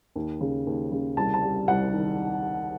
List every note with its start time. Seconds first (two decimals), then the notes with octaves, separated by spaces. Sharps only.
0.16 D#2
0.41 C#3
0.67 D#2
0.92 C#3
1.17 C2 A5
1.34 A5
1.43 G3
1.68 C2 F#5
1.93 D#3